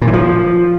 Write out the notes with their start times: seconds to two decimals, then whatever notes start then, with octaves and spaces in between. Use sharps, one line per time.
0.02 A#2
0.07 E3
0.13 F3